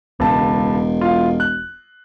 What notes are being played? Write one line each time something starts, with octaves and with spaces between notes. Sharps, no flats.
E1 C#2 A5
F4 F5
F#6